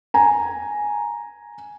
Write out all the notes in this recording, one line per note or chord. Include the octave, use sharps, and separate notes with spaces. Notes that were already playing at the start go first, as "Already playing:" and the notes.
G#5 A#5